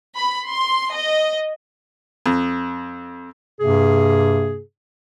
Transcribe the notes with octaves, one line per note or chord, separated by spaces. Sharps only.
B5
C6
D#5
F2
G2 C3 A#3 G#4